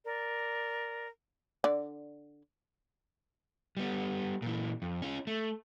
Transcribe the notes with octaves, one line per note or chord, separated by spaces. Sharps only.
A#4 D5
D3 D5
G3 B3
A#2 E3
F2
C#4 F4
A3